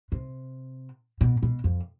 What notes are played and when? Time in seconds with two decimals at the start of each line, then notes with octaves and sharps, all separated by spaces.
0.12 C3
1.21 B2
1.43 B2
1.64 F2